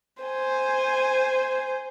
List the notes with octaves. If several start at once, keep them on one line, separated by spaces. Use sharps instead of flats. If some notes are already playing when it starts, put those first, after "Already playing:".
C5 G#5